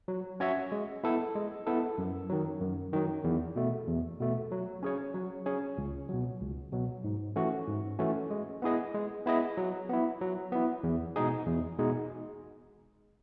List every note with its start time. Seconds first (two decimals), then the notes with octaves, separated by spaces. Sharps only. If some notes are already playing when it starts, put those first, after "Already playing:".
0.08 F#3
0.40 C#4 F#4 C#5 E5
0.72 G#3
1.04 B3 E4 A4
1.35 G#3
1.67 B3 E4 A4
1.98 F#2
2.30 D#3 F#3
2.61 F#2
2.93 D#3 F#3
3.24 E2
3.56 B2 A3
3.87 E2
4.20 B2 A3
4.52 F#3
4.83 C#4 G#4 C#5
5.14 F#3
5.46 C#4 G#4 C#5
5.78 C#2
6.09 B2 F#3
6.41 C#2
6.73 B2 F#3
7.04 G#2
7.36 E3 A3 C#4 F#4
7.67 G#2
7.99 E3 A3 C#4 F#4
8.30 G#3
8.62 B3 E4 G#4 D#5
8.94 G#3
9.26 B3 E4 G#4 D#5
9.57 F#3
9.89 B3 E4
10.21 F#3
10.52 B3 E4
10.83 E2
11.16 B2 G#3 D#4 G#4
11.47 E2
11.79 B2 G#3 D#4 G#4